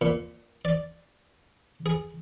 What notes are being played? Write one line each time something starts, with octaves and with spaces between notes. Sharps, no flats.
A#2
D5
G#4